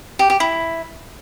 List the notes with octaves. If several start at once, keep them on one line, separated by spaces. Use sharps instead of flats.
G4
G4
E4